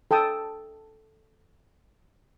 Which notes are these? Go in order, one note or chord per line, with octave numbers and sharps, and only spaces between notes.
A4 G5 A5 D#6